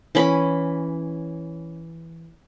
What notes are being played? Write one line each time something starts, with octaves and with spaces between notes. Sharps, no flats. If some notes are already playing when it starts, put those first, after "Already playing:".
E3 C#4 B5